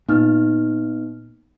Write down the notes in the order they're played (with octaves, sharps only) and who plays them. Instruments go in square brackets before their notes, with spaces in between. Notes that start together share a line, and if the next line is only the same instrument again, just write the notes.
[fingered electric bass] A#2 [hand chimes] B3 D#4 F6